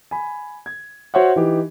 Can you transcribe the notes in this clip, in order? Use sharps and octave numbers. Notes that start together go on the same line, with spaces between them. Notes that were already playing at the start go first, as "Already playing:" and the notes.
G#5 B5
G#6
F#4 C5 C#5 E5 F#5
E3 D#4 G4